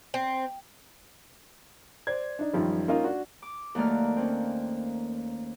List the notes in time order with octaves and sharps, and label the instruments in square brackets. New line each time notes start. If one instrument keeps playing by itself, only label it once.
[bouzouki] C4
[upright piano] C5 D5 G#6
D4 D#4
F#2 D#3 F3 G3
A#3 C#4 D#4 F4
D4 F#4
[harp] D6
D#2 F#3 A3 A#3 D5 F6
C4 C#4